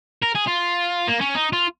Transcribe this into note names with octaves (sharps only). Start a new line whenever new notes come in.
A#4
G#4
F4
A#3
C#4
D#4
F4